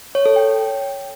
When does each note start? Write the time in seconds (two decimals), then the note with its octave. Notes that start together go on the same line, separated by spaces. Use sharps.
0.15 C#5
0.26 A4
0.36 G5